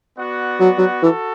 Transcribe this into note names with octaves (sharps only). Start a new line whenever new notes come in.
B3 F#4 D5 F#5
F#3
F#3
E3 F#4 A4